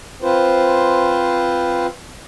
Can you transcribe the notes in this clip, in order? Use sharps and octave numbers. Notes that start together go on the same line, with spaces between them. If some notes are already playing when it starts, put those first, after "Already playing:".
C4 F4 B4 C5